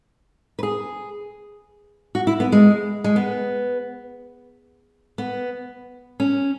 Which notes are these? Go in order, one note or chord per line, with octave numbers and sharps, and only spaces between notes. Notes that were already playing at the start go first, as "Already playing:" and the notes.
B4
G#4
F#4
E4
B3
G#3
G#3
B3
B3
C#4